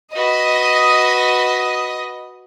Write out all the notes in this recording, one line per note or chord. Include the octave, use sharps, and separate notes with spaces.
F#4 B4 D#5